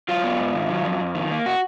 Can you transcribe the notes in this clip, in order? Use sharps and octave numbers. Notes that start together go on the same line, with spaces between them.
F#3 F4
B3
G#2
D#3
F#3
F2
F2
D#3
A#3
F#4